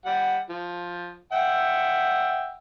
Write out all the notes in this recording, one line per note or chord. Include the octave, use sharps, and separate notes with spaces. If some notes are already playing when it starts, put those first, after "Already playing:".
G3 F#5
F3
E5 F#5 G5